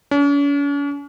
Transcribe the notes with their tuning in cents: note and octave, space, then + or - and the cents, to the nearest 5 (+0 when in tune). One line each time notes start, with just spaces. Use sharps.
C#4 +45